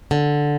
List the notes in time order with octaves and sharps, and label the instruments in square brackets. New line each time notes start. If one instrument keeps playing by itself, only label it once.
[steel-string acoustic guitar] D3